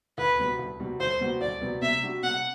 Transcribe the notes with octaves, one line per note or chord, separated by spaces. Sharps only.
D2 B4
C3 G3 B3 F#4
D2
C3 G3 B3 F#4
D2 C5
C3 G3 B3 F#4
D2 D5
C3 G3 B3 F#4
C3 E5
G3 D4 F#4
C3 F#5